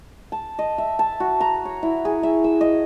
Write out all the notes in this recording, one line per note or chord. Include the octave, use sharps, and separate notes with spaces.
A5
D#5
E5
A5
F#4
A#5
C#5
E4
G#4
E5
E6
D#5